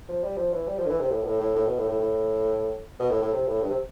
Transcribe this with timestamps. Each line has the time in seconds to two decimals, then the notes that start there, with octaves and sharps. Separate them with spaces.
0.09 F3
0.24 G3
0.37 F3
0.53 E3
0.68 G3
0.79 F3
0.85 D3
0.89 E3
1.00 C3
1.11 A2
1.23 B2
1.26 A2
1.41 A2
1.56 A2
1.66 B2
1.78 A2
1.89 A2
2.00 A2
2.99 B2
3.10 A2
3.22 A2
3.33 C3
3.48 A2
3.62 G2
3.70 C3